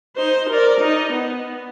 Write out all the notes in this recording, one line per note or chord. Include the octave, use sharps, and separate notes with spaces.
D#4 C5
A#4 D5
D#4
B3